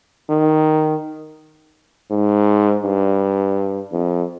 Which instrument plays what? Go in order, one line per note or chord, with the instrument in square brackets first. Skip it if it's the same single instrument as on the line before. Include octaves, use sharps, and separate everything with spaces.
[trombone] D#3
G#2
G2
F2